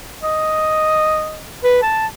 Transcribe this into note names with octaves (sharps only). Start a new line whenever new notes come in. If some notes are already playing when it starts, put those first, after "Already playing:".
D#5
B4
A5